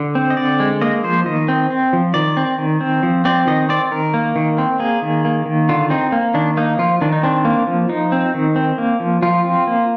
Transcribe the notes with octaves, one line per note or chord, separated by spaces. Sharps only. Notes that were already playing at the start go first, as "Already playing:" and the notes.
Already playing: D3
C4
D#5
D3 D5
G#3
A#3 D#5
F3 C5
D#3 D#5
C4
C4
F3
D#3 D5
C4
D#3
C4
F3
C4 D5
D#3 D#5
C4 D5
D#3 A#4
A#3
D#3
C4
A#3 G#4
D#3
A#3
D#3
D3 F4
C4 D#4
A#3
D#3 D4
A#3 D#4
F3 F4
D#3 D4
D#4
C4 D4
A#3
F3
F3 D#4
C4
D#3
C4
A#3
F3
F3 F4
C4
A#3